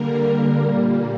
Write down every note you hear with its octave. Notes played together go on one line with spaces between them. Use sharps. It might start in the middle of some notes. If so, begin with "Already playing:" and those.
Already playing: D3 G3 A#3 A#4
A#2 G3 A#3